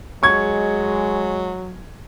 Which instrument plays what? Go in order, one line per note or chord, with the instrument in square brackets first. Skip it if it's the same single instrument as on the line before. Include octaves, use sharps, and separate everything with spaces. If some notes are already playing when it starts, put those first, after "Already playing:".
[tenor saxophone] F#3 [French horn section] G#3 [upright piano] C#6 G#6